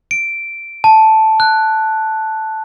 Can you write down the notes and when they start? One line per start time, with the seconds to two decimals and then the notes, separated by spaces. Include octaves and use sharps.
0.11 D7
0.84 A5
1.40 F#6